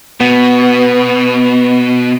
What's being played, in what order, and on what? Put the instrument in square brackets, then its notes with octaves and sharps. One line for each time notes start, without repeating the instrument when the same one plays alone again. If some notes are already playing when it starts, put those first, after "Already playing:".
[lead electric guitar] B2 [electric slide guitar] B3